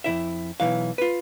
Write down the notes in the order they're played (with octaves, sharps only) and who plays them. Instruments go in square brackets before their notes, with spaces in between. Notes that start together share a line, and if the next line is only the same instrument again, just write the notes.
[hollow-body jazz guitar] F2 A#2 E4 E5
B1 C3 E3 F5
F4 B4